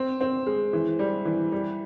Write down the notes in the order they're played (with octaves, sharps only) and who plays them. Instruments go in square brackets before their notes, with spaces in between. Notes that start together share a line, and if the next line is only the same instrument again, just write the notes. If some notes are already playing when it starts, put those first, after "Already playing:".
Already playing: [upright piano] C4
C4
G#3
E3
G3
E3
G3